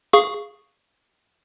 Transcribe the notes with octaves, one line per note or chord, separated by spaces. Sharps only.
G#4 F5 C#6